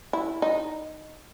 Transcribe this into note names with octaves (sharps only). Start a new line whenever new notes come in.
E4
D#4